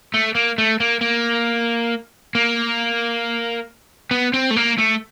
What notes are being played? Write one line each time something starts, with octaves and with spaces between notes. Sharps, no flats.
A3
A#3
A3
A#3
A#3
A#3
B3
C4
A3
A#3
A3